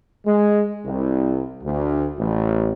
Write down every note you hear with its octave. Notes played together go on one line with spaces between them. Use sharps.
G#3
C2
D2
A1